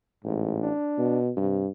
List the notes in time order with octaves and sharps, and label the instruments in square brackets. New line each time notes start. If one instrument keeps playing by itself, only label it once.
[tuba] A1 [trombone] G#2
[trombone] D4
[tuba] B2
[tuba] G2 [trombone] C3